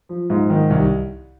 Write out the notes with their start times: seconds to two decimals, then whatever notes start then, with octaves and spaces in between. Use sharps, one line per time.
0.09 F3
0.30 G#2
0.50 D#3
0.70 C2